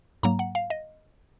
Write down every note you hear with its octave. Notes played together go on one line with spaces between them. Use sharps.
G#2 F#3 A#3 A#5
F#5
F5
D#5